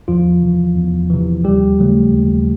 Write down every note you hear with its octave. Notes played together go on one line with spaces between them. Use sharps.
E2 F3 F4
C3 E3
E2
C3 E3
D#2 G3 G4
C#3 F#3 A3
D#2